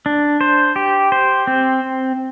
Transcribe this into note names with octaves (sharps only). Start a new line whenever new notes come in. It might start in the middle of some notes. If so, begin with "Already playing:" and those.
D4
C5
G4
C5
C4